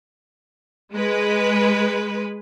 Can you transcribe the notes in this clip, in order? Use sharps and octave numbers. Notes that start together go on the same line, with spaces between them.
G#3 B4